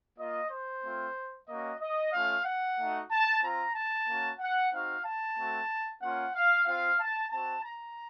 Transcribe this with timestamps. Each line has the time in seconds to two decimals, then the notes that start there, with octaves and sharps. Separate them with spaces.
0.17 A#3 F4 D#5
0.50 C5
0.82 A3 C4 F4
1.48 A#3 C#4 F#4 D#5
1.81 D#5
2.13 A3 C#4 F4 F5
2.45 F#5
2.78 A3 D#4 F#4
3.09 A5
3.43 C4 F4 A#5
3.75 A5
4.07 A#3 C#4 F#4
4.39 F#5
4.72 C4 D#4 F#4 F5
5.05 A5
5.37 A3 C4 F#4
6.01 A#3 C#4 F4 F#5
6.34 F5
6.67 C4 F4 F5
7.00 A5
7.31 C4 F#4 A5
7.64 A#5